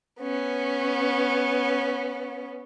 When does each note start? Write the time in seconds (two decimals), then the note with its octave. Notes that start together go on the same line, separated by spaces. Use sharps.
0.21 B3 C#4